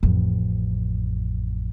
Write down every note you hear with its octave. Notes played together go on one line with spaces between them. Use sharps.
A1 F2